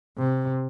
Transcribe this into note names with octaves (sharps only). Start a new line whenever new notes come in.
C3